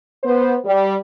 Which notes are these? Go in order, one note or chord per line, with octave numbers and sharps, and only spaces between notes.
B3 C5
G3